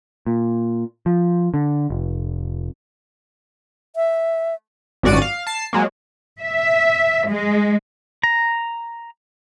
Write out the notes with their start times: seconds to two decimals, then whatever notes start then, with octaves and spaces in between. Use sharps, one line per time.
0.27 A#2
1.06 F3
1.54 D3
1.90 F1
3.96 E5
5.03 G#1 F#2 F#4 D5 C#7 D#7
5.22 F5
5.47 A5 C7
5.73 F#3 G#3 A#3
6.41 E5
7.28 G#3
8.24 A#5